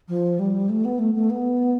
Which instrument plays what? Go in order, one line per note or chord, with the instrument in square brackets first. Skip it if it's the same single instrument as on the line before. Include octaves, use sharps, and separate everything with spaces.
[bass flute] F3
G3
A3
B3
A3
A3
B3